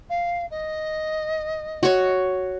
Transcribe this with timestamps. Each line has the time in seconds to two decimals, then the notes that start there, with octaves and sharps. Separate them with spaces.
0.09 F5
0.51 D#5
1.83 F#4 C#5